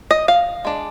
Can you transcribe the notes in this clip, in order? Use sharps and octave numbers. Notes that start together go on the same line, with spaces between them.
D#5
F5
G#3 D4